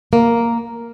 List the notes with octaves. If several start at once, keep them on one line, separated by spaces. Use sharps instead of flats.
A#3